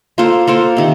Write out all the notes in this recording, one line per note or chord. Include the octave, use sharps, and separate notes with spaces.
A#3 F4 A4 C5
A#3 F4 A4 C5
C3 D#3